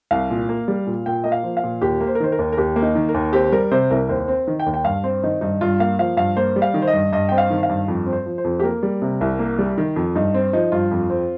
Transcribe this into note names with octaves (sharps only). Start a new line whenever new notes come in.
C2 F5
A#2
A#3
G3
A#2
A#2 G5
A#3 D#5
F5
F3
F5
A#2
D#2 G4
A#3
C5
A#4
D#3 C5
A#4
D#2
A#4
D#2 G4
A#3
D#4
D#3
A#4
D#2
C4 G4
G3 A#4
C3 C5
C2 A#4
D#2 C5
C4
D#3
G5
D#2
G5
G2 F5
C4 C5
D#3 D#4
G2 D#4
G2 F4
A#3 F5
F3 F5
G2 F5
A#3 C5
G3
F5
D#3
C5
D#5
G2
G2 D#5
C4 G5
F5
D#3
F5
G2
F2
C4
C5
F3
C5
F2
G4
A#3 A#4
G3
C3
C2
A#3
G3
D#3
F2
G2 D#4
C4
F3 D#4
G2 F4
F2
C4